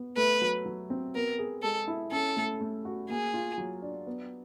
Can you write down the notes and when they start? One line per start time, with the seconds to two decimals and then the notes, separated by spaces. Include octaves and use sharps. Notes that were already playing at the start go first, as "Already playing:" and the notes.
Already playing: B3
0.17 A3 B4
0.42 F#3
0.66 F#3
0.90 C4
1.15 B3 A#4
1.39 G#4
1.63 G#3 A4
1.88 E4
2.12 C#4 A4
2.37 A3
2.61 A3
2.85 F#4
3.10 A#3 G#4
3.34 F4
3.58 F#3
3.82 D4
4.06 B3